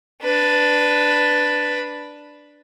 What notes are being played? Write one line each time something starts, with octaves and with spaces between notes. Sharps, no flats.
D4 B4